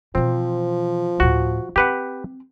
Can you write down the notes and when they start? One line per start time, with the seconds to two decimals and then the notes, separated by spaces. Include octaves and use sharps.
0.15 B2 E3 F3 C4
1.20 D2 A2 F#4
1.76 C4 G4 B4 F#5